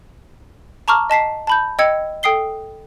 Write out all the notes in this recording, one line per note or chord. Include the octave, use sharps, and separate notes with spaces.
A5 A#5 C#6 D6 F6
D#5 A5 B6 C7
A5 B5 G6
D#5 G5 E6 G#6 C#7
A4 G5 D#6 C7 G7